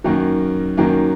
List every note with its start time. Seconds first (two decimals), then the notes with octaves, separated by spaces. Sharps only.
0.04 F#2 D#3 F#3 A#3
0.77 F#2 D#3 F#3 A#3